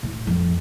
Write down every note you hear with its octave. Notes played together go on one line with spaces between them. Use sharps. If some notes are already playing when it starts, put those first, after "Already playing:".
A2
F2